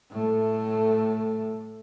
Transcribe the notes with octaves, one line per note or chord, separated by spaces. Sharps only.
A2 A3